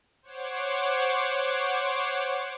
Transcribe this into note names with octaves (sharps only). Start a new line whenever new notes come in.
C5 C#5 F#5 D6